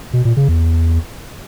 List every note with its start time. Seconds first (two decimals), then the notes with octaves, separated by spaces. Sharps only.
0.13 B2
0.25 A#2
0.37 C#3
0.49 E2